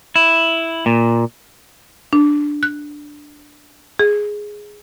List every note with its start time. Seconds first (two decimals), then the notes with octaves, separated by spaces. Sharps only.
0.16 E4
0.86 A#2
2.13 D4
2.63 F#6
3.99 G#4